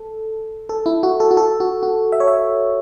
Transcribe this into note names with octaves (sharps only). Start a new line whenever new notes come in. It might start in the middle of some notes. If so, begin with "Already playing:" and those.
Already playing: A4
A4
E4
F#4
A4
F#4
A4
F#4
F#4
E5
C#5
E5